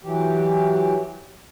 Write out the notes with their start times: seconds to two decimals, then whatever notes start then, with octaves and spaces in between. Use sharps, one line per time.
0.04 E3 F#3 G4